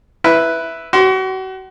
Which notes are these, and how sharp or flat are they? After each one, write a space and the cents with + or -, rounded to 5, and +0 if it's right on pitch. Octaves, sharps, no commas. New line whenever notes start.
E4 +0 B4 +0
F#4 +35 C6 +0